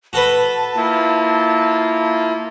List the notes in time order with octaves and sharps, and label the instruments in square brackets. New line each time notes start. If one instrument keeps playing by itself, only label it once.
[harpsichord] F#4 A4 B4 [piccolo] A5
[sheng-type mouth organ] A#3 E4 F4